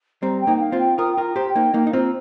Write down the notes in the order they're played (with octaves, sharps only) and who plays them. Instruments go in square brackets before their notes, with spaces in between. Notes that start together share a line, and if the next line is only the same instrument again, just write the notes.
[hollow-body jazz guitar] G3 C4 [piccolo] A#5
[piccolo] G5
[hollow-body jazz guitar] A#3 D#4
[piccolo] G5
F5
[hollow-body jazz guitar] C4 F4
[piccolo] G5
[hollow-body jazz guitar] F4 A#4 [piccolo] D#6
[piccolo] G5
[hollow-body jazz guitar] F4 A#4
[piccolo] A#5
[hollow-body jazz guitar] G4 C5
[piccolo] G5
[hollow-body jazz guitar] A#3 D#4
[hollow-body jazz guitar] A#3 D#4 [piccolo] F5
[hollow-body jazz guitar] D#4
[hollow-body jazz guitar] C4 F4 [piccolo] A#5